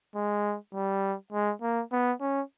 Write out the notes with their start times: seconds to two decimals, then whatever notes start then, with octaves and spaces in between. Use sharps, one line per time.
0.15 G#3
0.74 G3
1.32 G#3
1.62 A#3
1.92 B3
2.21 C#4